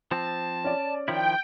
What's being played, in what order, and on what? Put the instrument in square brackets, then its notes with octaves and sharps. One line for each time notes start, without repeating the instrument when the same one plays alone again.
[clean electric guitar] F3 C4 [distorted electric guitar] A5
[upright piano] C#4 D5
[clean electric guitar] D#3 F3 E4 [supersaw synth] G5